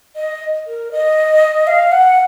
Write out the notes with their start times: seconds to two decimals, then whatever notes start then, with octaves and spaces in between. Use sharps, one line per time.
0.16 D#5
0.67 A#4
0.92 D#5
1.67 F5
1.92 F#5